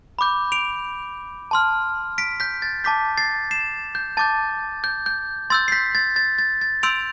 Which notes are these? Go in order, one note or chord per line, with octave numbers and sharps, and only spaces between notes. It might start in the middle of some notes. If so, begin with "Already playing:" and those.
B5 D6 G6
D7 F7
A5 C6 F6
B6 D7
G6 B6
A6
A5 D6 G6 B6
A6 C7
C7 E7
G6
A5 D6 G6 A6
G6
G6
C6 E6 G6 A6
C7
G6 B6
A6
A6
A6
A6
C6 E6 G6 D7 F7